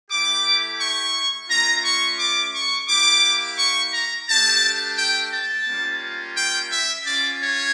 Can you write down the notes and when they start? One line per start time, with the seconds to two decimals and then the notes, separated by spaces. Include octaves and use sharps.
0.10 A3 E4 G4 D6
0.80 C#6
1.50 A3 C#4 F4 A#5
1.84 C#6
2.19 D6
2.54 C#6
2.89 A#3 E4 G4 D6
3.59 C#6
3.94 A#5
4.29 A3 D4 G4 A5
4.98 G5
5.33 A5
5.68 G3 A#3 C#4 F4
6.37 G5
6.71 E5
7.06 C#4 F4 D5
7.42 C#5